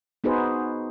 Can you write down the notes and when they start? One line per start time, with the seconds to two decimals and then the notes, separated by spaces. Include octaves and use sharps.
0.24 B3 D#4 F#4 G#4 B4 C5